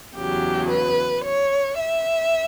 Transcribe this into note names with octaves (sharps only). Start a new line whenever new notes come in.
E2 C#3 F#3 G4
B4
C#5
E5